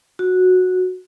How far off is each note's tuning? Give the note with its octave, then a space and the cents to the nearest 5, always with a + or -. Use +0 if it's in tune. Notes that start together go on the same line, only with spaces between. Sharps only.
F#4 -10